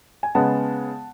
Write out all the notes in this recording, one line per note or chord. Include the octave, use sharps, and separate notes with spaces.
G#5
C#3 G#3 B3 F#5 A5